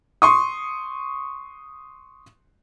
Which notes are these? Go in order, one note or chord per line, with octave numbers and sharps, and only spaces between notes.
C6 C#6 D#6